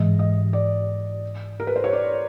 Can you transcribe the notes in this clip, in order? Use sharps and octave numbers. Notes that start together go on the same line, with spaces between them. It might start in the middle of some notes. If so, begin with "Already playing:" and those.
Already playing: G#2 E3 G#3 D#5
D#5
D5
A#4
B4
C5
C#5
D5